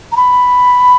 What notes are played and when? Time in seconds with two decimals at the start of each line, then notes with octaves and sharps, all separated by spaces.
0.12 A#5
0.16 B5